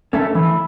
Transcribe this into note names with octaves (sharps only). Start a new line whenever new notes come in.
A3 C#4 A4 E5
E3 E4